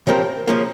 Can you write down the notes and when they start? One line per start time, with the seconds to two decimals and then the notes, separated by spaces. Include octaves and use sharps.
0.07 C#3 F3 C4 G4 A#4
0.47 C#3 F3 A#3